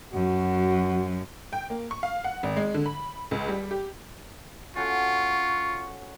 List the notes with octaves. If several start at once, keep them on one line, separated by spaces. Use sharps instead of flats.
F#2 F#4
G5
A#3
C#6
F5
F#5
G#1
G#3
D3
B5
C#2
G3
G4
C#4 F4 F#4 A4 C#6